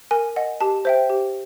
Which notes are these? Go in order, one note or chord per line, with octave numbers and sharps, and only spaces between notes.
A#4 G#5
D#5 F#5
G4 A5
C5 E5 G5
G4